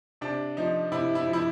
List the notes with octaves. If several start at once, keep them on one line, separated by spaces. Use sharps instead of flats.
C3 D4
F3 D#4
C3 E4
E4
F3
E4